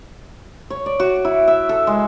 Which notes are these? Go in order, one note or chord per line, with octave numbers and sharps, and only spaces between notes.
C#5
D5
F#4
E4
E5
A4
G#3